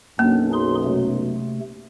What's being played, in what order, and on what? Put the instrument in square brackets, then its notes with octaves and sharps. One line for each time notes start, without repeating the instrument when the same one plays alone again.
[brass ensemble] B1 F#2 [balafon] A#3 [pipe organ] C#4 D4
[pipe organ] D#4 G#4 C6
C3 A3